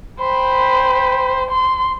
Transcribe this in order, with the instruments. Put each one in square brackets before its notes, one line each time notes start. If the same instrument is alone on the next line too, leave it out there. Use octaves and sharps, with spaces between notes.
[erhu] C5 [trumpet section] G5 B5
[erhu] C6